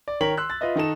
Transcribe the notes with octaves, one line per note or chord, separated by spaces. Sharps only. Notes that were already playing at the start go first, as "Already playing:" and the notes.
D5
D#3 A#4 C#5 G5 B6 F#7
C6 E6 F#6
A6
F4 B4 D#5 E5
D#3 D#4 A4 E7